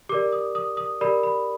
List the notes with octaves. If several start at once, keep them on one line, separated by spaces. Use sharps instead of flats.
G4 A#4 D5 D6
D#6
D#6
D#6
G4 A#4 D5 B5
B5